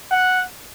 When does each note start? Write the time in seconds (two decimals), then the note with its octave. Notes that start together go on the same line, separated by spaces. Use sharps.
0.11 F#5